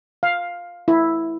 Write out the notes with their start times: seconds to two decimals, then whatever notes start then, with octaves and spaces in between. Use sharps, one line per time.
0.23 F5
0.88 E4